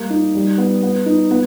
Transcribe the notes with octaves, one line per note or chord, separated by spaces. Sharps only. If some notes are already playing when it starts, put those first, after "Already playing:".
Already playing: G3 A#3
D#4
G3
B3
B3
D#4
B3